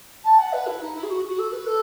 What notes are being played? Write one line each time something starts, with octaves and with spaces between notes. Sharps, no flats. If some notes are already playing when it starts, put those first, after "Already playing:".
A5
F#5
B4
E4
D#4
E4
G#4
F#4
F#4
A4
B4
A4